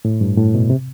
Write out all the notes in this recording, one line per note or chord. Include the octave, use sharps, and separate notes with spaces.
A2
G2
A2
B2
C3